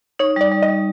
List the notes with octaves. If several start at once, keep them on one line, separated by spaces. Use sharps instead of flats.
D#4 C#5
G3 D5
G3
D#5
G3